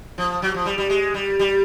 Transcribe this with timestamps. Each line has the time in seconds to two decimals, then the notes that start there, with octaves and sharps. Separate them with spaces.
0.18 F3
0.42 F#3
0.54 F3
0.65 G3
0.78 G3
0.90 G#3
1.14 G3
1.39 G3